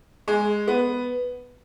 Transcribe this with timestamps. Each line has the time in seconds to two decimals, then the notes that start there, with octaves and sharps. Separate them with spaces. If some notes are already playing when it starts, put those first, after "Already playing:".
0.28 G#3
0.68 B3